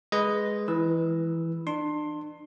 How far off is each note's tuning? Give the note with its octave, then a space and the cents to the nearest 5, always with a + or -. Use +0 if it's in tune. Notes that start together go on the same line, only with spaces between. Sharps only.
G#3 +0 B4 +0 D#5 +0
E3 +0 B4 +0 E6 +0
D4 +35 C6 +15